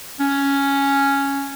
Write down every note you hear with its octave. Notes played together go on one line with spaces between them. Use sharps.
C#4